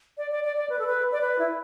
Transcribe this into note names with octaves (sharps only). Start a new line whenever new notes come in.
D5
D5
D5
D5
B4
A4
B4
D5
B4
E4